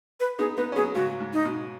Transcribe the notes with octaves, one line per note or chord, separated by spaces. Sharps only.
B4
B3 D#4 G#4
B3 D#4 B4
C#4
F#3 B3 G#4
G#2 C#3 F#4
G#2
D#4
B2